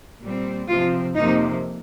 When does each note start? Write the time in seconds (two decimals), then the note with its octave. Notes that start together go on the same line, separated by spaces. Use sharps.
0.23 A#2 G3 C4
0.69 C3 F3 C4 F4
1.15 F2 C3 F3 A#3 D#4